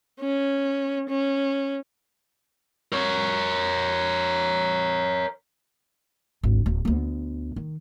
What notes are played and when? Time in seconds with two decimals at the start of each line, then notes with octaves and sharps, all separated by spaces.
0.20 C#4
1.09 C#4
2.92 A#4 C#5
6.43 G#1 D2
6.66 D1
6.85 D2 B3
7.56 D#3